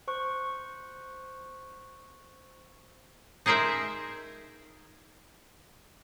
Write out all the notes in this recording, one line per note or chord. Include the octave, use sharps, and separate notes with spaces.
C5 C#6 F#6
D#4 G#4 A#4 C5 E5